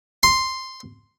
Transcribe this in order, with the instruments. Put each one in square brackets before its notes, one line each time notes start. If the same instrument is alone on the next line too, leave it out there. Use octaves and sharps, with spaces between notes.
[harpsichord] C6